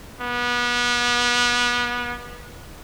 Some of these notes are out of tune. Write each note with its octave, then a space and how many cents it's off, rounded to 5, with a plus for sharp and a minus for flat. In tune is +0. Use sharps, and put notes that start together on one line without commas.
B3 -30